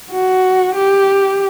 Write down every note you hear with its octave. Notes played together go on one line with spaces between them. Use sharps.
F#4
G4